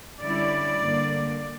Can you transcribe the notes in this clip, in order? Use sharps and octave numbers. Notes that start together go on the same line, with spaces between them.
D3 G3 C#4 E4 D5
G2 D3 A#3